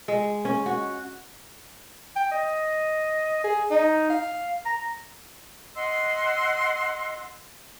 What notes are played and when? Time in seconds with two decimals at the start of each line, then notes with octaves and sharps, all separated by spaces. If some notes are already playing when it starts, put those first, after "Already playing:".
0.08 G#3
0.45 C#4
0.66 F#4
2.16 G5
2.31 D#5
3.44 G#4
3.71 D#4
4.10 F5
4.66 A#5
5.76 D#5 F#5 C6 E6